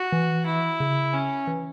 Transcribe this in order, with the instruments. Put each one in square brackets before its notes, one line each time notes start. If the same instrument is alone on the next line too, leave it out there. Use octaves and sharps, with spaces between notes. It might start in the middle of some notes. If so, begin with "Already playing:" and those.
Already playing: [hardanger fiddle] F#4
[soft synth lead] E3
[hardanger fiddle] E4
[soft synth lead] C#3
[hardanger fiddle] C#4
[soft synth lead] E3